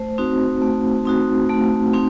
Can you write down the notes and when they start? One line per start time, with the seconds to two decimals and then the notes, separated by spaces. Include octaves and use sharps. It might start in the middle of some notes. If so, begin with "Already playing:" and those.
Already playing: A3 C5
0.18 C4 D#4 F#4
0.62 A3
1.05 C4 D#4 F#4
1.49 A3
1.93 C4 D#4